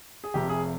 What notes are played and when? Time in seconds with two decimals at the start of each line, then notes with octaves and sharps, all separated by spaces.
0.24 G#4
0.34 F1 F2 C3 G4
0.49 G#4